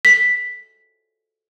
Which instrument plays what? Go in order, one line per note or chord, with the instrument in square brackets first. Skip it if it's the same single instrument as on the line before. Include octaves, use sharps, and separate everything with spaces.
[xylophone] B6